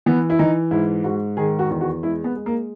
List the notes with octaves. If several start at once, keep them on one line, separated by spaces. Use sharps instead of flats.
E3 B3
E4
E3 D#4
G#2 E4
G#2 F#4
D#3 G#4
F#4
E2
F#4
G#3 E4
B3
G#3
A#3